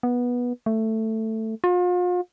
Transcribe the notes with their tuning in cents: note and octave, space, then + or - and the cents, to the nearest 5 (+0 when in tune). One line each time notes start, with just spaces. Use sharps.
B3 -15
A3 +10
F4 +40